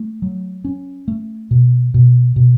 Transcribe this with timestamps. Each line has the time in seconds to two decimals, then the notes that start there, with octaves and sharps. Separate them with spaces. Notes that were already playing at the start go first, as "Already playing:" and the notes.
Already playing: A3
0.22 F#3
0.65 C#4
1.08 A3
1.51 B2
1.94 B2
2.36 B2